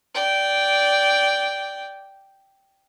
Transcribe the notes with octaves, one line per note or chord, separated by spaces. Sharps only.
D5 G5